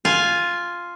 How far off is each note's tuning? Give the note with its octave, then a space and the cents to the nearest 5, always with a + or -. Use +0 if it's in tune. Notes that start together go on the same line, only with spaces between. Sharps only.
F4 +0 G#5 +0